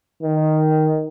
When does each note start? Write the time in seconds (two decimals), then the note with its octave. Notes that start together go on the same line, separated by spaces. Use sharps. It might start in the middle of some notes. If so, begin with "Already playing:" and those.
0.23 D#3